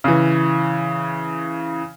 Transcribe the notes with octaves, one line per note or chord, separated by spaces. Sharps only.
C#3 E3